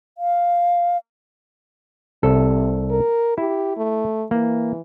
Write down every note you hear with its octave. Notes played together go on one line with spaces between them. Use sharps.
F5
C2 C3 A4
A#4
E4 G4
A3
E3 A#3